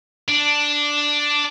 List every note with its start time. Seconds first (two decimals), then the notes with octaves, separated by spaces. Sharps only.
0.29 D4